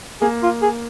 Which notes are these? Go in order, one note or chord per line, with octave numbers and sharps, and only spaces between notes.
A#3 G#4
F4
G#4